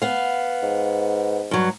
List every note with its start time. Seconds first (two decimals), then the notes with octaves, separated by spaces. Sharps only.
0.02 B3 F5
0.63 G#2
1.51 G2 F#3